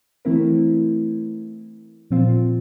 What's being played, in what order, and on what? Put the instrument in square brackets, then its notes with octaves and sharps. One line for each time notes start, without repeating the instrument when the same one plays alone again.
[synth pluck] E3 A3 C4 E4 A#4
A#2 F3 C4 F4